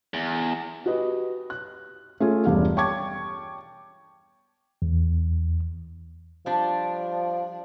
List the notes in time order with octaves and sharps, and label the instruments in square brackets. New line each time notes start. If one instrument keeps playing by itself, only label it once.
[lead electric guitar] E2
[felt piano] F#4 G4 B4 D#5
F#6
A3 C#4 F4 G#4
E1 G2 D4 G4 F5
C#5 G5 A5 C#6 D6 G#6
[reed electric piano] E2
[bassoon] F3 [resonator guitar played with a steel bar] G3 D4